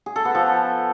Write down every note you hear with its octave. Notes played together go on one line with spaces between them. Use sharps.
G#4
A4
B3
F3